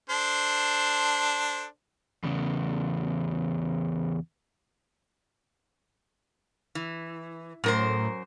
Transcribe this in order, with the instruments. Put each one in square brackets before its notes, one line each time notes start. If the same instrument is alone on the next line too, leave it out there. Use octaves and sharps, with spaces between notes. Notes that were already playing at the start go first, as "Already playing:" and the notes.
[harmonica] D4 A4 C5
[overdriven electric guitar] E2 C#3
[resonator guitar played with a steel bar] E3
[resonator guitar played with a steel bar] F#2 A#4 C5 [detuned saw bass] A2